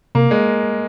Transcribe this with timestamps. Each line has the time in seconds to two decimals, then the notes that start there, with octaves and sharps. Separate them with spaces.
0.15 C3 A#3
0.31 G#3